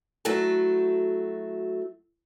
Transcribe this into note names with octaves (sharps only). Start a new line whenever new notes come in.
F#3 A3 E4 F#4 A4